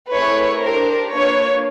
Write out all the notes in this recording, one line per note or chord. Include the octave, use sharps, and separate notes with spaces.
A3 C4 E4 G#4 B4 C#5
D4 G4 A#4 C5
A#3 D4 F4 B4 C#5